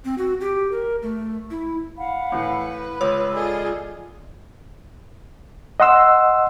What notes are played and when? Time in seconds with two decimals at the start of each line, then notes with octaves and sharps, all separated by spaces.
0.05 C4
0.18 F#4
0.41 G4
0.72 A#4
1.02 A3
1.51 E4
1.97 F5 F#5 B5
2.32 A2 E3 B4
3.01 C#2 C#5 E6
3.34 F4 G#4 A4 D5 D#5
5.80 D#5 F#5 C6 E6